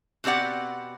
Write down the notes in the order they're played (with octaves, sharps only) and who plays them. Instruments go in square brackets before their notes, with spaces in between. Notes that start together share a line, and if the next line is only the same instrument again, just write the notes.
[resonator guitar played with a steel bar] B2 C4 G4 D5 F#5